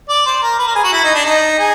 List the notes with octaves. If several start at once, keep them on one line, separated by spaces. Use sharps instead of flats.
D5
C5
A#4
B4
A#4
G#4
F#4
E4
D#4
D4
D#4
G#4